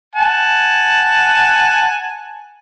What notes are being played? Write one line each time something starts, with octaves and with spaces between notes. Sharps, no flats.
F#5 G#5 A5